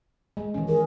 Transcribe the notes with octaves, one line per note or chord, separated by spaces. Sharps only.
G#3
D#3 E3 C#4
G#4 A#4